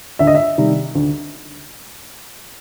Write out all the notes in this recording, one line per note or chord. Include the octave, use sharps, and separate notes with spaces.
D2 E5
D#5
E5
C3 D#3 G3
D2